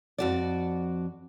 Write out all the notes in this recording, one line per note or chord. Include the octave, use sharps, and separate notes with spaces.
F2 F#4 D5